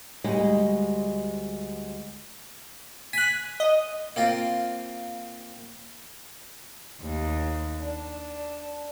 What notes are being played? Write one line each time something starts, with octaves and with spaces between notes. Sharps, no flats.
D2 G3 G#3 D#5
G#5 F#6 B6
D#5
A#3 C4 F4
D#2
D4